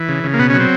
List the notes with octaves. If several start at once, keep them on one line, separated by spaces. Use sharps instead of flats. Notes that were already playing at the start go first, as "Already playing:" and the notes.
Already playing: E3
C#3
C#3
A#3
B2 B3
C#4
F#3
C4